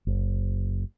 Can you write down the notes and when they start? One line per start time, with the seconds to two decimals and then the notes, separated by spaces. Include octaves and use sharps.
0.07 F#1